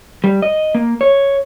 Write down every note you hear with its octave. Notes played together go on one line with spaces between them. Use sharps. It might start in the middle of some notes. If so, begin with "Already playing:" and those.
G3
D#5
A#3
C#5